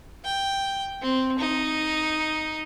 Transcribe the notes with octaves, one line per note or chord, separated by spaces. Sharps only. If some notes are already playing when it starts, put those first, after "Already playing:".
G5
C4
D#4